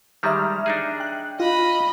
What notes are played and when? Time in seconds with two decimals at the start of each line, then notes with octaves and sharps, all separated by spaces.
0.23 D#3 G3 G#3 E5 A#5 F6
0.66 D4 D#4 G#4
1.00 G5 F#6
1.40 F4 D#5 B5